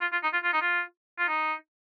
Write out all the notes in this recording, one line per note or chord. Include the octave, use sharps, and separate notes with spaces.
F4
F4
D#4
F4
F4
D#4
F4
F4
D#4